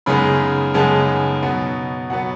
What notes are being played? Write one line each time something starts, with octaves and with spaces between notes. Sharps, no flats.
F#2 C#3 G#3 B3 D#4 B5
F#2 C#3 G#3 B3 D#4 A5
B2 F#3 B3
B2 F#3 B3 F#5